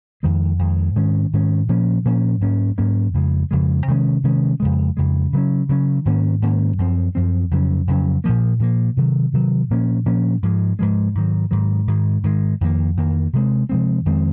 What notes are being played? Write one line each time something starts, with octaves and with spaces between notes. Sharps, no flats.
F2 D#3 G#3
F2 D#3 G#3
G#2 D#3 G#3 C#4
G#2 D#3 G#3 C#4
A#2 F3 A#3 C#4
A#2 F3 A#3 C#4
G#2 F#3 A#3 C#4
G#2 F#3 A#3 C#4
F2 C#3 F3 G#3
F2 C#3 F3 G#3
C3 D#3 G#3 C#4
C3 D#3 G#3 C#4
F2 C#3 G#3
F2 C#3 G#3
C#3 F#3 C#4
C#3 F#3 C#4
G#2 D#3 A#3 C#4
G#2 D#3 A#3 C#4
F#2 F3 C4
F#2 F3 C4
F2 C#3 F#3 C#4
F2 C#3 F#3 C#4
A#2 F3 A#3
A#2 F3 A#3
C3 D#3 F#3
C3 D#3 F#3
A#2 F3 A#3 C#4
A#2 F3 A#3 C#4
G#2 F3 G#3
G#2 F3 G#3
G#2 D#3 F#3
G#2 D#3 F#3
G#2 D#3 G#3
G#2 D#3 G#3
F2 D#3 A#3
F2 D#3 A#3
C3 F3 G#3 C4
C3 F3 G#3 C4
F2 D#3 G#3 C4